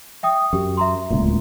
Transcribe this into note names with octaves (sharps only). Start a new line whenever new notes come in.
E5 G5 D#6
F#2 G4
E5 A#5 C6
D1 C#2 A#2